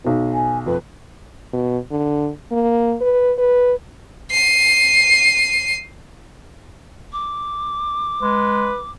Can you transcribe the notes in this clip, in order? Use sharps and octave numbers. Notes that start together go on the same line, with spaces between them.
B1 B2
G#5
F2 B4
B2
D3
A#3
B4
B4
C7 D#7
D6
G#3 B4